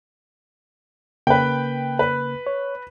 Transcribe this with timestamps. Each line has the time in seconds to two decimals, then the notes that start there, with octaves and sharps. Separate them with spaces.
1.27 C#3 A#3 B4 G5
1.99 B4
2.47 C#5